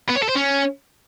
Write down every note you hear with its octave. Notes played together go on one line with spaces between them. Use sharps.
B3
C#5
A4
C5
C#4